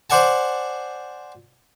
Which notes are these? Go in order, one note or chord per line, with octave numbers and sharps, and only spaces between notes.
C5 D5 F#5 G#5 A5